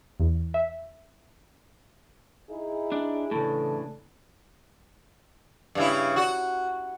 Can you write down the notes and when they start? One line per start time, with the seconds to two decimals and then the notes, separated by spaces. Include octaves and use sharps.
0.20 E2
0.54 E5
2.49 D#4 E4 G#4
2.92 D4
3.31 A2 C#3 E3 D4 A4
5.75 G2 C#3 E4
6.16 F#4